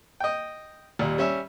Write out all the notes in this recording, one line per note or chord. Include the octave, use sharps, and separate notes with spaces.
D#5 G5
D#2 A#2 G3
G3 C#4 E5